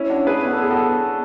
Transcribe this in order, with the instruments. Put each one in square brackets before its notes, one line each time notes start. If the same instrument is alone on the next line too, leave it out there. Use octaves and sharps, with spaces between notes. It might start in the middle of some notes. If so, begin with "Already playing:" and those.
Already playing: [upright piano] C#4 E4
D4 F#4
G#4 B4
[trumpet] B3 [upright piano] B4
[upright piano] A4
G#4
F#4 A4